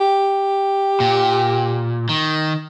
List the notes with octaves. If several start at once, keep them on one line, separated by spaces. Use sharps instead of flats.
G4
A#2
D#3